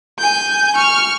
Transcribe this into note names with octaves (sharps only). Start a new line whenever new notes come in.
G#5 G6
C#6 F6